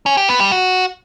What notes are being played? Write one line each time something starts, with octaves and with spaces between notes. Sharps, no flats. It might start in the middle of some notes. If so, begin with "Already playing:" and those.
C#4
G4
B3
G3
F#4